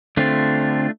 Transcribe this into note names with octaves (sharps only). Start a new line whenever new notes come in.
D3 A3 C4 D4 F4